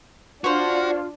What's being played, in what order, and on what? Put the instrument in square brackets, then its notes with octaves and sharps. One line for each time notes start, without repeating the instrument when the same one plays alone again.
[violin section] D4 [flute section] F4 [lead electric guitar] F#4 [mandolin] C5 C#5